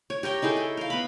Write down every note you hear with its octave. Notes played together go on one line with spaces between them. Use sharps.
C#5
G4 A#4 C#5 G5
D#4 E4 G#4 A4
G5
A#4 F5
B3 B5